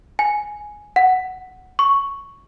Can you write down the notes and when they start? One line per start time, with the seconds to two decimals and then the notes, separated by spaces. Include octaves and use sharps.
0.19 G#5
0.96 F#5
1.79 C#6